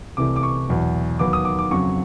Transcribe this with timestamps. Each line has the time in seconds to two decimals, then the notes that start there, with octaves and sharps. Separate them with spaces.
0.17 C2 C3 E3 A3 D6
0.36 D6
0.43 C#6
0.69 E2 B2 F#3
1.19 D#2 D#3 F#3 B3 D6
1.33 D#6
1.45 D6
1.59 D6
1.71 F2 C#3 F#3 C#6